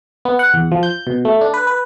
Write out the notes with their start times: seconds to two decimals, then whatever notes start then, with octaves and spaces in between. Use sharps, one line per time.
0.25 B3
0.39 F#5
0.54 E2
0.72 F3
0.83 G6
1.07 B2
1.25 A3
1.41 D4
1.54 B4
1.67 B4